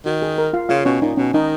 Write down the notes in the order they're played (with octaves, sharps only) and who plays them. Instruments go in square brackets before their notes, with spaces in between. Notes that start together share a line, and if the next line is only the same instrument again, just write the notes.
[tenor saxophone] D#3 [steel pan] F#4
[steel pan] G#4
A#4
F4 F5
[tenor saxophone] C#3 [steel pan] F4 F5
[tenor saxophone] B2 [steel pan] C#4 C#5
[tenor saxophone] A#2 [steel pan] D#4
[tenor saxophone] B2 [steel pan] C#4
[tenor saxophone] D#3 [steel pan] D#4